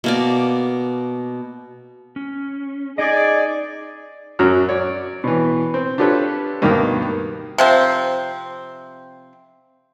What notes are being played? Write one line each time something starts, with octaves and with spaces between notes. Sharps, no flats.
B2 A#3 D5
C#4
D#4 G#4 D5 D#5
F#2 F#3 C#4 F#4 F6
C#5 D5
B2 E3
C4
D4 F4 G4 A4 B4 C#5
D2 G2 B2 D#3 A#3 B3
C3 F3 C4